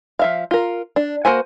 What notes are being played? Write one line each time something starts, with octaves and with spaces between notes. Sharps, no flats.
F3 E5 F5
F4 A#4
D4
A#3 F#4 C5 G#5